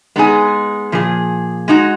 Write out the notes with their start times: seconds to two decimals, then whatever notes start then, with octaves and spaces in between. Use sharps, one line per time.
0.16 G#3 B3 D#4 G#4
0.92 A#2 F3 G#4
1.68 G#3 D#4 F#4